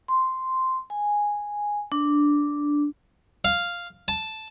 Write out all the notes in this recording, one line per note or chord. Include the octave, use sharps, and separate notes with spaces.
C6
G#5
D4
F5
A5